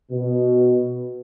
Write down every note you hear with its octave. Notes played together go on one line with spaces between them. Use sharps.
B2